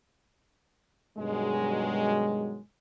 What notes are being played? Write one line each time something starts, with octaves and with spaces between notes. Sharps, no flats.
G2 B2 D#3 F#3 G#3